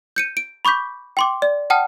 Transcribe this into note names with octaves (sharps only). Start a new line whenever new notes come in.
G6 C#7 D#7
D7
B5 C#6 D6 G6 B6
G5 C6 D6
D5
F#5 G5 A5 D#6 F6